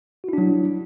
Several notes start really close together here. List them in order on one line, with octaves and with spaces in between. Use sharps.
F#4 E4 D4 F#3